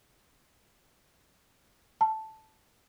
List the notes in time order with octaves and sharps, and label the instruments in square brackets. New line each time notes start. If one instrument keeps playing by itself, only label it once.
[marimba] A5